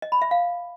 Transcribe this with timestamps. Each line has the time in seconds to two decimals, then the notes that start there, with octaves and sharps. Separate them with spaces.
0.02 D#5
0.12 B5
0.22 E5
0.31 F5